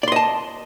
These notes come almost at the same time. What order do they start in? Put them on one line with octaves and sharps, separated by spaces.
D5 C6 D#5 A5